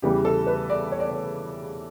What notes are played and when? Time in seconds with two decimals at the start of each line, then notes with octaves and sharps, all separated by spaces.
0.02 E2 C#3 E3 G3 G4
0.25 A4
0.47 B4
0.70 D5
0.92 C#5
1.00 D5
1.09 C#5